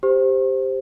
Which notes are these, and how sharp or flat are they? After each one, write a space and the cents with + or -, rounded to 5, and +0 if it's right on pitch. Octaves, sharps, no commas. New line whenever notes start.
G4 +5 C5 +0